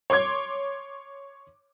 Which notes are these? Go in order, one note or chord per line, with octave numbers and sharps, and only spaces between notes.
C#5 C6 D6 G#6